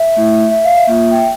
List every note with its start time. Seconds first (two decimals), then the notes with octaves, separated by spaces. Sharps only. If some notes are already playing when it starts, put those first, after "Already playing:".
Already playing: E5
0.16 A3 E4
0.51 E5
0.65 F5
0.77 E5
0.87 A#3 F4
1.12 G5